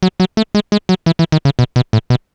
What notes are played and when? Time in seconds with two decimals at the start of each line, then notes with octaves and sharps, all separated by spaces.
0.03 F#3
0.20 F#3
0.37 A3
0.55 G#3
0.72 G#3
0.89 F#3
1.06 E3
1.19 E3
1.32 D#3
1.45 C#3
1.59 B2
1.76 B2
1.93 A2
2.10 B2